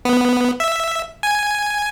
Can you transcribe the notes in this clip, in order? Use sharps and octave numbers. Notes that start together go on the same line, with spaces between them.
B3
E5
G#5